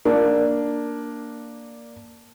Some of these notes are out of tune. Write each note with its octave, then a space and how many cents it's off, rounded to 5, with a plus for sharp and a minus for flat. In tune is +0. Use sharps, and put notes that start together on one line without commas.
A#3 +0 D4 +0